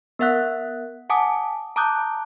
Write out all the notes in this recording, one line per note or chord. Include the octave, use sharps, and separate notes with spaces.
B3 A#4 E5 F#5 F#6
F#5 G#5 A5 D6 D#6
A5 A#5 D6 D#6 F#6 G6